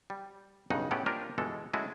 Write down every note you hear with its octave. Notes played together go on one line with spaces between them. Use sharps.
G3
B1 G2 C#3 D#4 F#5
A2 A3 B3 C#4 G4 F#5
A#3 D4 F4 G4 A#4 C5
G1 B2 E3 G#3 A4
G#3 A3 C#4 E4 F#4 G#4